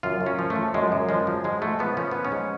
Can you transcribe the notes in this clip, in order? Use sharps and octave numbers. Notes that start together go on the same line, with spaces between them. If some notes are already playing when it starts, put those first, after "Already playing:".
F#2 F4
F#2
C#4
F3
A3
F3
F#2 G#3
F#2
F3 G#3
F3
G#2 G#3
G#2 A3
F3 B3
F3 C#4
G#2 B3
C#4
G#2